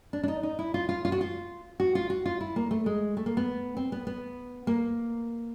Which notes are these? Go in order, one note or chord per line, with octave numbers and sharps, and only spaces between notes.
D4
D4
D#4
D#4
E4
F4
F4
F4
F#4
F4
F#4
F4
F#4
F4
E4
A#3
A3
G#3
A3
A#3
B3
C4
B3
B3
A#3